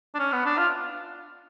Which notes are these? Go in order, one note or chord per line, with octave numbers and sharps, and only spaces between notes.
D4
C#4
B3
D4
F4